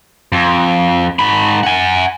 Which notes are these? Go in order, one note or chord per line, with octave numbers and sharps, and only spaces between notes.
F2
G#2 B5
F#5 G#5